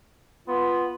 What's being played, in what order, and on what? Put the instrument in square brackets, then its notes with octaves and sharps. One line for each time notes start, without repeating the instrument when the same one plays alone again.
[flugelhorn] B3 [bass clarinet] F4